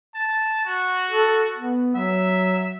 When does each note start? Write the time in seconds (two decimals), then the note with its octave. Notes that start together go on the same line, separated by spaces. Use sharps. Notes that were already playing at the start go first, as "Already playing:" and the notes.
0.15 A5
0.65 F#4
1.10 A4
1.56 B3
1.96 F#3 E5